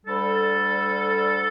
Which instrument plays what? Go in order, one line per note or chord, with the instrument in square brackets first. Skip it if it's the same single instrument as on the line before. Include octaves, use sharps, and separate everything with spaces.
[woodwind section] D2 D3 G3 A4